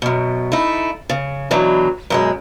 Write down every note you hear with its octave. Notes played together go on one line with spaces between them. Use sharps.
F#2 B2
A3 D#4 E4
C#3
B2 E3 F#3 D4 D#4
F#2 B2 G#3